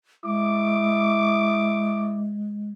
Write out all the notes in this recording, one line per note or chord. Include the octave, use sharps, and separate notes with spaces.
G#3 E4 D6